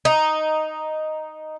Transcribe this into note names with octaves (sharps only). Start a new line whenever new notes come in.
D#4